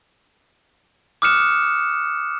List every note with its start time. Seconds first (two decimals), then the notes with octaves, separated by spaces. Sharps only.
1.22 D6 D#6 F6 F#6 C#7 E7